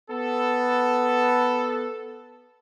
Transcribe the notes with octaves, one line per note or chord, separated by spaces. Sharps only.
B3 A4